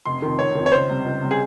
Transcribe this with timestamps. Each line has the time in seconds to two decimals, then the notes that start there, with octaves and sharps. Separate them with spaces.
0.05 F1 C6
0.22 F2 D#3
0.39 F1 C#5
0.55 F2 D#3
0.66 C#5
0.72 C#2 C5
0.89 C3 G3
1.05 C#2
1.22 C3 G3
1.31 G#4